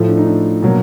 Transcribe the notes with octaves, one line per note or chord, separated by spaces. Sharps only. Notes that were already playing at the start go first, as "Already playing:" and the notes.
Already playing: A2 F3 A3
D4
D#4
D4
B2 F#3 A#3